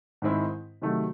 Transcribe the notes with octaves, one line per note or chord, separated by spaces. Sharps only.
G#2 D#3 G#3 C4 E4
C3 D#3 F#3 A3